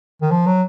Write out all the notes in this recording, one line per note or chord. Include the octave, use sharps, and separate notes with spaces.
D#3
F3
F#3